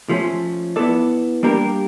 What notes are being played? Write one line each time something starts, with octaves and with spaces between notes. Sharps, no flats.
F3 A3 C#4
B3 E4 A4 D5
G3 A#3 D4 G4 A#4